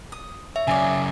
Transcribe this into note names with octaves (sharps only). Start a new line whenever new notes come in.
D#6
C#5 E5
F#2 C#3 D5 G#5